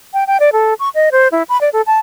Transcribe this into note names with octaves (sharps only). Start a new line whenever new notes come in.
G5
G5
D5
A4
C#6
D#5
C5
E4
B5
D5
A4
A5